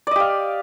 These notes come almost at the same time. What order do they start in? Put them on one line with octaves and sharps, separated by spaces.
D5 D#5 G4 F5